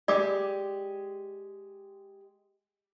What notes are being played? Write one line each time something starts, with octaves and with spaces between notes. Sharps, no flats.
G#3 G4 D5 D6